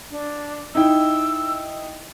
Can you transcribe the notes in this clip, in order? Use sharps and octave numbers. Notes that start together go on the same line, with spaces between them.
D4
D#4 E4 G5 E6